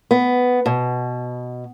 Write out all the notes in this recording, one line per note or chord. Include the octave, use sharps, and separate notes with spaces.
B3
B2